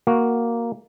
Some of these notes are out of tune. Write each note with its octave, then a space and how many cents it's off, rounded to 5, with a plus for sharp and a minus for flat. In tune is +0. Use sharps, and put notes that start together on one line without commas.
A#3 +0 F#4 +0